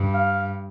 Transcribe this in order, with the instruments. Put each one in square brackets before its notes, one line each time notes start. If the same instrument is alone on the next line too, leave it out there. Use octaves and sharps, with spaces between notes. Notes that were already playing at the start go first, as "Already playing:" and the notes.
Already playing: [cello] G2
[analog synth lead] F5